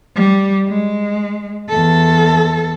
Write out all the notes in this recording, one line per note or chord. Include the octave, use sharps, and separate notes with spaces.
G3
G#3
E2 A4